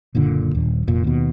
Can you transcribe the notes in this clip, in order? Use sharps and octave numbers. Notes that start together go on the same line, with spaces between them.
F#1 A#2 D3
D#1
F1 A#2
D#2 B2